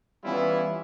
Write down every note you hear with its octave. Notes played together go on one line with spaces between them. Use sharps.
E3 G3 B3 C#4 E4 F4